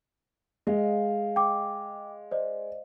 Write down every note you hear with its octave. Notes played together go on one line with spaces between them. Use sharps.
G#3 D#5 F5
G5 D6
C5 D5 D#5